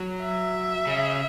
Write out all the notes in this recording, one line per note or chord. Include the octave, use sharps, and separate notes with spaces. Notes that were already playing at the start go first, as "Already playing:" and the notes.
Already playing: F#3
E5
C#3